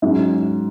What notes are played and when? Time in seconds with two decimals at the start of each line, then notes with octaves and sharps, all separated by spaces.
0.02 G#2 F#3 C#4